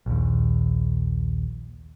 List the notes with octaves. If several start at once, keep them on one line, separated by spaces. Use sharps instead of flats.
A#1 D#2